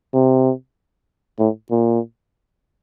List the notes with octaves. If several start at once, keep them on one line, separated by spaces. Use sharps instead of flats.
C3
A2
A#2